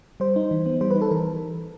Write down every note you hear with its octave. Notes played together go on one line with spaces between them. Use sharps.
G3 C5
D#4
E3
B3
G3 C5
B4
D#4
A4
E3 A#4